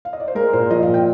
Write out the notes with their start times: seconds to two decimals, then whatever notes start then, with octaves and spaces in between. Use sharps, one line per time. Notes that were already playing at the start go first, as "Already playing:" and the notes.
0.05 F5
0.13 D#5
0.20 D5
0.28 C5
0.35 G#3 A#4
0.53 A#2 C5
0.71 F3 D#5
0.83 F5
0.88 A#2
0.94 G5